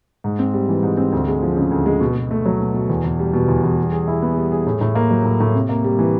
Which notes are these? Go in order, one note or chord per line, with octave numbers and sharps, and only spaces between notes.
G#2
C4
G3
E3
G#2
C4
D2
G#3
F3
C#3
D2
G#3
B2
B2
A3
F#3
B2
B2
E2
E2
G3
B2
E2
E2
G3
G#4
E4
B3
G3
G#4
A2
A2
A#3
F#3
A2
A2
C3
A#3
G3
E3